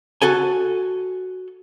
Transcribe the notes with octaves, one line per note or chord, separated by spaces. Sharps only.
F#4 A4 G#5